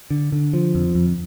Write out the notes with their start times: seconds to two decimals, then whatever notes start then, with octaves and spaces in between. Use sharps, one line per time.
0.10 D3
0.32 D3
0.53 F3
0.75 F2
0.95 F2